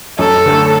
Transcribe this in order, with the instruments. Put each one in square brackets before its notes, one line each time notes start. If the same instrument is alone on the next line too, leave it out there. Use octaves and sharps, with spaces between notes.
[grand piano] F#2 [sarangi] A4
[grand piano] D3 A3